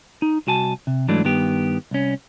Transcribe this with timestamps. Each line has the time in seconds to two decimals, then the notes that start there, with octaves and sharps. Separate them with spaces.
0.22 D#4
0.47 C2 F#4 G#5 A5
0.87 C3
1.08 G#2 E3 F#3 A3 D4
1.24 G2 D#3 B3 G4
1.91 C2 C#4